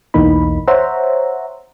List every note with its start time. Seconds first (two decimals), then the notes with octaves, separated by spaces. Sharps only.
0.14 B1 E2 E3 A#3 D#4 B5
0.68 C5 C#5 E5 F#5 A#5